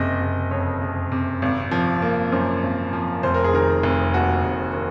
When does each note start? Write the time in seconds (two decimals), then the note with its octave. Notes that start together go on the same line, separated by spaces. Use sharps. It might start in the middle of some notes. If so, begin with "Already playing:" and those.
Already playing: F#1 C3 D#5
0.21 F#1
0.51 F2 C#5
0.81 F#1
1.12 C3
1.42 G#1
1.71 F3
2.02 A#3
2.32 F#2 C5
2.63 G#1
2.93 F3
3.23 F1 C5
3.34 A#4
3.44 G#4
3.54 D#3 A#4
3.83 F1
4.14 D#2 F#4
4.44 F1
4.74 D#3